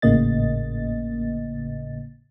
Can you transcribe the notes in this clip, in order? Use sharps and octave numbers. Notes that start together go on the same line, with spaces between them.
G#1 A2 C#3 A#3 D#5 A6